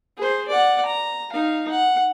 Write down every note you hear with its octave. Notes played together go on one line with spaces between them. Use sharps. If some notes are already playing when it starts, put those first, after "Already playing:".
G#4 C5
D5 F#5
A#5
D#4 F5
F#5